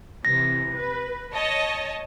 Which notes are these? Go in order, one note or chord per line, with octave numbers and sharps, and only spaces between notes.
C3 E3 A#6
B4
C#5 D#5 A5